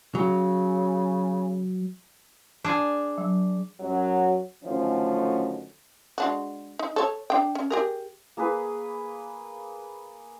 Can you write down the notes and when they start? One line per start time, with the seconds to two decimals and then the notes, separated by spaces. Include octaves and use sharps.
0.15 C#3 F#3
2.64 D4 G#4
3.18 F#3
3.80 F#2 F#3
4.65 F#2 D3 D#3 F3 A3 C#4
6.18 G#3 D4 F#4
6.79 D#4
6.96 A4 C#5
7.30 D4 G5
7.55 C#4
7.70 G4 G#4 A#4
8.37 A#3 G#4 B4